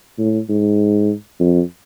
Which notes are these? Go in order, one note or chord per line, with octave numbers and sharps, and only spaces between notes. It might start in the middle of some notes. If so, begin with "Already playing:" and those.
A2
G#2
F2